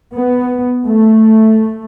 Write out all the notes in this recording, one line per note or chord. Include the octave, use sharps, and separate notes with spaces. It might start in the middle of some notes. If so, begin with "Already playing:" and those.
B3
A3